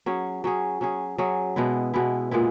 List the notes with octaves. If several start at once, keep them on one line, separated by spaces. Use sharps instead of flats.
F#3 C#4 G#4
F#3 C#4 G#4
F#3 C#4 G#4
F#3 C#4 G#4
B2 G#3 B3 E4
B2 G#3 B3 E4
A#2 G#3 B3 E4